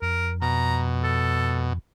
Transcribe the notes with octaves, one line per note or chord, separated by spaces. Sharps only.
F2 A#4
B2 A#5
A4